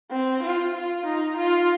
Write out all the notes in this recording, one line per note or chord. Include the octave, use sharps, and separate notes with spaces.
C4
F4
F4
D#4
F4